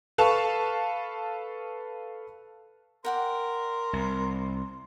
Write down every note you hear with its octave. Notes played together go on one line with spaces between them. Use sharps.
A4 B4 F5 A5 C#6
A#4 D5 F#5 G5 C6
C2